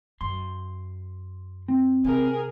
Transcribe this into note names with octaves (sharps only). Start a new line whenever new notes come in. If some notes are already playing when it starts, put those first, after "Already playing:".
F#2 C6
C4
C3 G#4 A#4